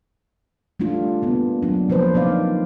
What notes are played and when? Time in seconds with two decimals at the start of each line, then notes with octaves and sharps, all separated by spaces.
0.80 G3 A3 D4 F4
1.22 A#3 B3
1.62 F#3 D4
1.90 F3 A#3 B4 C5
2.14 A#3 C4 D#4 D5 F5